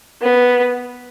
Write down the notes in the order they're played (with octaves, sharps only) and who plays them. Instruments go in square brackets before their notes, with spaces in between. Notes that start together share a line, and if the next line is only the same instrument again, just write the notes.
[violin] B3